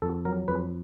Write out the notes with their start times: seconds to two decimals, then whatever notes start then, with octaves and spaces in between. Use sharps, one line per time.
0.02 F2 A4
0.25 F#3 A#4
0.48 F2 B4